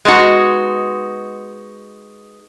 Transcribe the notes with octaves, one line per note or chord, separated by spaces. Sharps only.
G#3 B3 D#4 F#4